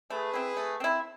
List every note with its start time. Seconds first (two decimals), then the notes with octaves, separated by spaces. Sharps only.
0.10 A3 G#4 B4
0.34 C4 E4
0.57 A3
0.80 C4 E4